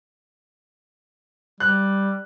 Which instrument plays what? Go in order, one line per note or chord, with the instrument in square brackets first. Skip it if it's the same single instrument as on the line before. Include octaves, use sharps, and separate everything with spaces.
[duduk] G3 [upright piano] F#6